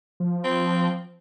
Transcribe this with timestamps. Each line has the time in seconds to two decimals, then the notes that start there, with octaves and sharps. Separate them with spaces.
0.20 F3
0.44 C4